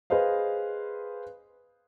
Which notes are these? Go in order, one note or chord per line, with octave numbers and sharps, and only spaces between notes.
G#4 B4 C5 D#5 F5